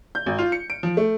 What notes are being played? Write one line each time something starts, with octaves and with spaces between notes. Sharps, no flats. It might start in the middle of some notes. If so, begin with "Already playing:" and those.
G6
G#1
F4
C#7
D7
F3
A3